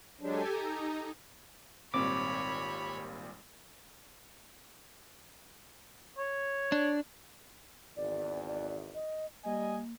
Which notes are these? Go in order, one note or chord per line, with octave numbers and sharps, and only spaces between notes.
F#3 G#3 D4 G4 A4 G#5
D#4 A#5
G#1 A#2 G3 C4 C#5 B5 D6
C#5
D4
G#1 E2 D5
D5
D#5
G3 A#3 D#5 G#5